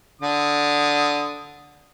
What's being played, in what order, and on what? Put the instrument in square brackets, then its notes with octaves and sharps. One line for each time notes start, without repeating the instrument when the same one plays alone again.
[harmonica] D3 D#6